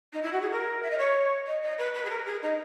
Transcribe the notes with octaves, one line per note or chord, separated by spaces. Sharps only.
D#4
E4
F#4
G#4
A#4
E5
D#5
C#5
D#5
D#5
B4
B4
G#4
A#4
G#4
D#4